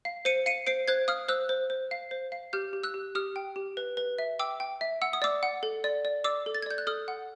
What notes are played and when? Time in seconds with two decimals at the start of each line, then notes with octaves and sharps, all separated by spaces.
0.05 F5
0.25 C5 C#7 D#7
0.46 F5 C#7 D#7
0.67 C5 C7 D7
0.88 C5 F#6 G#6
1.08 F5 D#6 F6
1.29 C5 E6 F#6
1.49 C5
1.70 C5
1.91 F5
2.11 C5
2.32 F5
2.53 G4 F6 G6
2.73 G4
2.83 E6 F#6
2.94 G4
3.15 G4 D#6 F6
3.36 G5
3.56 G4
3.77 B4
3.97 B4
4.18 E5
4.39 G5 D6 E6
4.60 G5
4.81 E5
5.02 F#5 E6
5.13 D#6
5.22 D5 D6 E6
5.43 F#5
5.63 A4
5.84 D5
6.05 D5
6.24 D5 D6 E6
6.46 A4
6.55 A6
6.62 G#6
6.66 D5 G6
6.78 F#6
6.87 A4 D#6 F6
7.08 F#5